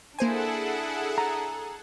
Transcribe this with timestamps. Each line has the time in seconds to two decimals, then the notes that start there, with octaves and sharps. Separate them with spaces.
0.19 A#3 D4 E4 G#4 A4 C5 F#5 G#5
1.18 A#5